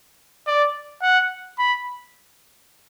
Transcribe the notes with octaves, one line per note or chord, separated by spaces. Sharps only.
D5
F#5
B5